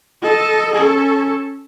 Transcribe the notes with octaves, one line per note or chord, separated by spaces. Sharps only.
A4 D#5
C#4 A4